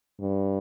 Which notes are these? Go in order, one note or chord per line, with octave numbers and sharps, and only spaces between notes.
G2